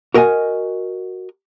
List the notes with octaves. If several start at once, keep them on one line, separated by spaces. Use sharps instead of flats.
F#4 A#4 D#5 F#5 G#5